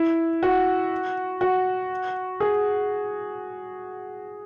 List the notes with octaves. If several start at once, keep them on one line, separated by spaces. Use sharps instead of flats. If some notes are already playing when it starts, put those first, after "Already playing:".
Already playing: E4
F#4
F#4
G#4